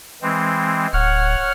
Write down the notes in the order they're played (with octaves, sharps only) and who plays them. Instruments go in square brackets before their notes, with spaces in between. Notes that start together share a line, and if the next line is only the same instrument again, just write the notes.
[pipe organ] E3 G#3 C4
[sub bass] D1 [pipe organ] C#5 F#5 F6